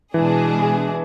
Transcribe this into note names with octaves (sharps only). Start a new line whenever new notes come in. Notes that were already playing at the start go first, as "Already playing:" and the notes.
B2 E3 G#3 D4 G#4